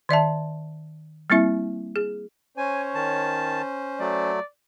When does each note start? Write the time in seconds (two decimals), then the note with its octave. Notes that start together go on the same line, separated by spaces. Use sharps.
0.09 D#3 D5 E5 A5
1.30 G3 A#3 C4 E4 E5
1.96 G#4
2.57 C#4 C5 C#5 G#5
2.95 D#3 A5
4.00 F#3 A3 D5